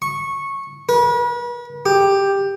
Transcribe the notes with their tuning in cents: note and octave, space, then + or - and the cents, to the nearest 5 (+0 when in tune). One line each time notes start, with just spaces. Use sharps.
C#6 -15
B4 -40
G4 +10